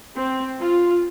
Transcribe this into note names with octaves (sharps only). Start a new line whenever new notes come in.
C4
F4